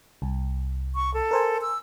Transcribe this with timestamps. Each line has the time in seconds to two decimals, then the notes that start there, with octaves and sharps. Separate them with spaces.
0.22 C2
0.95 C#6
1.14 A4
1.31 A#4 C5 G#5
1.62 E6